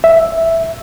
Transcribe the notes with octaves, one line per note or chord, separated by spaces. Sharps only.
E5